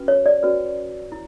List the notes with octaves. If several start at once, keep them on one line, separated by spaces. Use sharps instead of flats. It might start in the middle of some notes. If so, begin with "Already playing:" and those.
Already playing: C#4 F#4 B4
C#5
D5
C#4 F#4 B4
E4